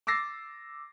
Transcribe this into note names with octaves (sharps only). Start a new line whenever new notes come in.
D6 E6 A6 A#6 C7